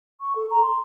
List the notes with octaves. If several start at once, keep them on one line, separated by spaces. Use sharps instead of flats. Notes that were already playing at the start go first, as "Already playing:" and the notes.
C#6
A4
A#5
C6